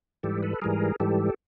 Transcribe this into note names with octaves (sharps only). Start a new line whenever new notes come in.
G#2 E3 G3 G4 A4
A4 B4
G#2 E3 G3 G#4 A#4
G#2 E3 G3 G4 A4